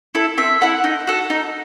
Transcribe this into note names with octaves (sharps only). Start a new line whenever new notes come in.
E4 A4
C4 E5
E4 A4 F#5
D#4
F#4 A4
D#4